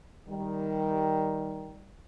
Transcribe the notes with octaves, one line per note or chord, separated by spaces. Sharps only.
D#3 G3